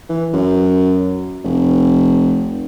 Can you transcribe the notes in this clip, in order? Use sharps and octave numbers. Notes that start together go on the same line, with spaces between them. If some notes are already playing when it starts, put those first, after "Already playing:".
E3
F#2
F1